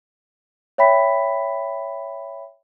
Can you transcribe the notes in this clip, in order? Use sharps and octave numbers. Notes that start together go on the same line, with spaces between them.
C#5 E5 G5 B5 B6